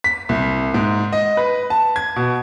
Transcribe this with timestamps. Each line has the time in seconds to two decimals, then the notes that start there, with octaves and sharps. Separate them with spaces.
0.04 B6
0.29 C2
0.74 G#2
1.13 D#5
1.37 B4
1.70 A5
1.96 G#6
2.16 B2